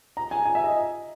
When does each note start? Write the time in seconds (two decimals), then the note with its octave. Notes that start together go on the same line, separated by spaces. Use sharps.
0.17 A#5
0.31 G#5
0.45 G#5
0.55 E5
0.64 D#5